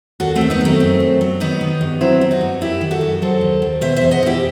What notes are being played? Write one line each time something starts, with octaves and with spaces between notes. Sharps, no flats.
D#2 F#4 A4
A3 C4
D#3
B3 D#4
F#3 A3 C4
F#2
F#3
F#3
D#3 B3 D#4
D#3
G2
F#3 C4 E4
F#3
D#4 F#4
G2
F#2 E4 G4
D#3
F#4 A4
F#2
F#3 A4 C5
D#2
D#3
B2 C5 E5
E2 C5 E5
D#5 F#5
B2 E4 G4